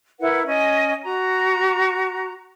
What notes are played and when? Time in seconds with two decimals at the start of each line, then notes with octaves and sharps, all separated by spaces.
0.19 E4 A#4 B4 F#5
0.46 C#4 D#5 G#5
1.04 F#4 A#5